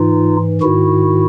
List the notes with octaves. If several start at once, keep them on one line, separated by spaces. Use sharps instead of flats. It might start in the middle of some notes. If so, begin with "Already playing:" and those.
Already playing: G#2 E3 D#4 F4
G#2 D#3 E4 F#4